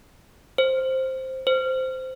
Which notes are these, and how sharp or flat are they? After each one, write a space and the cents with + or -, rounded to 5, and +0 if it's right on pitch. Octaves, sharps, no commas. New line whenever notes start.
C5 +5
C5 -10